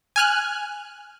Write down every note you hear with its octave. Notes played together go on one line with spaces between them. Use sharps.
G#5 F6 F#6